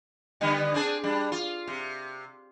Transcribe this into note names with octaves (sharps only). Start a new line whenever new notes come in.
D3 G3 B3
C4 D4 G#4
G3 D4
F4
C3